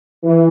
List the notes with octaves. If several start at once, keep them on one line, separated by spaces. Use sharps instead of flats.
E3